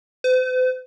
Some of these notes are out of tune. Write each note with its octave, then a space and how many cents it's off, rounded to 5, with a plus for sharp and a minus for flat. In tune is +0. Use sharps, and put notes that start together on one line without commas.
C5 -45